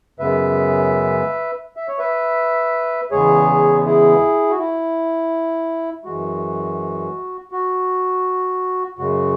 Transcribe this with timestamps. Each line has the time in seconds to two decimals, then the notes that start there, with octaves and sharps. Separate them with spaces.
0.19 F#2 C#3 G#3 B3 B4 E5
1.76 E5
1.88 C#5
1.98 B4 E5
3.11 E2 C#3 G#3 B3 G#4 C#5
3.86 E4 G#4
4.50 F#4
4.58 E4
6.05 F#2 E3 G#3 F#4
7.52 F#4
8.98 F#2 C#3 G#3 F#4